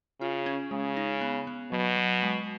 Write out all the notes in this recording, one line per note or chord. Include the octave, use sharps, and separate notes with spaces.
C#3 F4
C#4
C#3 G#3
D#4
B3
B3
B2 F#3
F#3
G#3